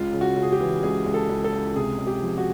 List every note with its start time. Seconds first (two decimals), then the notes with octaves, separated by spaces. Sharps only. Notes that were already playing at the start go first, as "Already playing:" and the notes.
Already playing: C#2 F4
0.13 C#3
0.21 F#4
0.36 C#3
0.42 G#4
0.52 G4
0.60 E3
0.83 C#2 G#4
1.06 C#2
1.14 A4
1.30 C#2
1.44 A4
1.53 C#2
1.75 C3 G#4
1.99 C#2
2.07 G4
2.22 F3
2.38 F#4